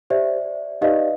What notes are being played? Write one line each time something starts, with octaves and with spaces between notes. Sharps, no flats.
G4 C5 D5 E5
D#4 G4 B4 D5 D#5 F5